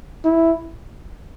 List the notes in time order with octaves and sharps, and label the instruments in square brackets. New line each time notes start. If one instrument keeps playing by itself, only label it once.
[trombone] E4